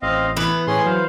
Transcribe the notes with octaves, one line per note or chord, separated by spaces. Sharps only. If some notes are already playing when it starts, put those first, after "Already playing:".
A1 C4 D#5 F5
E3 B3 B4
A2 C#4 G#4 C6
F#3 C5 F5